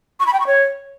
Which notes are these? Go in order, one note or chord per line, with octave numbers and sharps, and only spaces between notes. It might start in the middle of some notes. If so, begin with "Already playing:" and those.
C#6
B5
G5
C#6
C#5